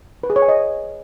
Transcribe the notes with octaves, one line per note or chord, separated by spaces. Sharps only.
B4
G#4
C#5
G#5
D#5